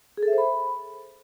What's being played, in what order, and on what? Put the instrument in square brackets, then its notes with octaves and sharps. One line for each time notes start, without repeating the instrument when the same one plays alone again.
[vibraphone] G#4
A4
E5
C5
B5